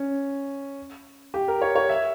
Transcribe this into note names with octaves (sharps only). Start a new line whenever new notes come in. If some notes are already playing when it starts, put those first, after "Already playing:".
Already playing: C#4
G4
A#4
C#5
C#5
E5